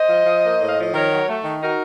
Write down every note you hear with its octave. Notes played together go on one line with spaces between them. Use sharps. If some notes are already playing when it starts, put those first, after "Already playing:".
Already playing: C5 D#5
F3
F3
A#3
A2
F5
F3 D#5
D#3 A#4 C#5
F#3
A3
D#3
D#4 F#4 A#4